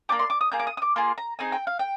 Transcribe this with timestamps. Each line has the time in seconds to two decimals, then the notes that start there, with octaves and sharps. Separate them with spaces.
0.09 A#3 D4 G4 D6
0.19 C6
0.30 D6
0.41 D#6
0.52 A#3 F4 G#4 G6
0.59 D6
0.67 D#6
0.77 D#6
0.82 D6
0.96 A#3 F4 G#4 C6
1.18 A#5
1.39 C4 D#4 G#4 G#5
1.52 G5
1.67 F5
1.79 G5